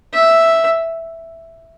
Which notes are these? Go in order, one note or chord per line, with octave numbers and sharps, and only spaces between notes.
E5